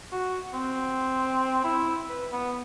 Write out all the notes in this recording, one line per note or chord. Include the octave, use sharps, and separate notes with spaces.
F#4
C4
E4
B4
B3